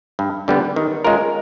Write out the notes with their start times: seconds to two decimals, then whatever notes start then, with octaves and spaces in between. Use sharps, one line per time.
0.19 G2
0.48 D3 G3 B3
0.76 D#3
1.04 G#3 C#4 F4 A#4